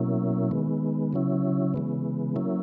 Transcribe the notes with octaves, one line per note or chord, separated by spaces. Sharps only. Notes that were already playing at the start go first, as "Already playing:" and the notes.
Already playing: B2 F#3 A#3 C#4 E4
D#3 G#3 B3
C#3 F#3 C#4 E4
C#3 E3 G#3 B3
F#3 A#3 C#4 E4